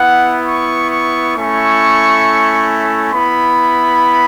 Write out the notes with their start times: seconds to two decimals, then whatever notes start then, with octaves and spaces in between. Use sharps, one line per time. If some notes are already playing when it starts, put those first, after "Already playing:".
Already playing: B3 E4 F#5
0.46 C#6
0.91 C#6
1.35 A3 C#4 E4 C#6
3.13 B3 E4 B5